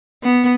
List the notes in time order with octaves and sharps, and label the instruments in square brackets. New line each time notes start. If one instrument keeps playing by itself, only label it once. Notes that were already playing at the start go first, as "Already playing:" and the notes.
[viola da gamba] B3